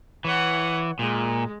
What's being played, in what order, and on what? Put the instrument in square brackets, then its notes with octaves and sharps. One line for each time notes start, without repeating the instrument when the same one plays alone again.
[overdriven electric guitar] E3 [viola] C#5 F#5
[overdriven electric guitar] A#2 [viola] G#3